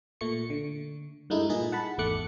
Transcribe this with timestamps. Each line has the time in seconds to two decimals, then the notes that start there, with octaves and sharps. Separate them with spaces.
0.21 A#2 A3 C#6 C#7
0.50 D3
1.30 G2 G#3 A3 D#4 E4
1.49 A#2 A#3 D#4 G#4
1.72 F#5 A5 B5
1.98 G#1 E2 A3 D6 F#6 C#7